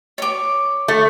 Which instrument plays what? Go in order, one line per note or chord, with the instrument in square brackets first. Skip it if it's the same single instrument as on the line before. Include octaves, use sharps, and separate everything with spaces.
[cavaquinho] C#5 D6
[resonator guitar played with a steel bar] A3